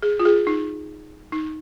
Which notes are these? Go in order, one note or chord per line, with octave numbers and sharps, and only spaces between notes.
G#4
F4
G#4
D#4
D#4